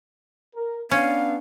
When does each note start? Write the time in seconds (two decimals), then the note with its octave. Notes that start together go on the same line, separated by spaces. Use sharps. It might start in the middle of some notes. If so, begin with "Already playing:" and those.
0.55 A#4
0.91 B3 C#4 D4 F5